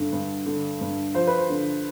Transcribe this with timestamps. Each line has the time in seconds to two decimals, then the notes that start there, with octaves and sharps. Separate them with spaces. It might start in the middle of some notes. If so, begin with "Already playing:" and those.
Already playing: G2 D3
0.13 G2
0.46 D3
0.81 G2
1.14 F3 C5
1.27 B4
1.38 C5
1.50 D3